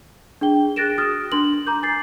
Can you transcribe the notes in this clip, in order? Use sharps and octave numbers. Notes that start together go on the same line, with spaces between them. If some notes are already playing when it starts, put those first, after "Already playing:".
D4 G#4 G5 G7
G#4 F#6 A6 A#6 D7 E7
F#4 D#6 F6 A6
D4 C6 F#7
A#5 D6 G6
G#5 A6 C7